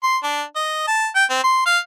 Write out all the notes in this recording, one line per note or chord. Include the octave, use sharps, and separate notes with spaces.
C6
D4
D#5
A5
G5
C4
C6
F5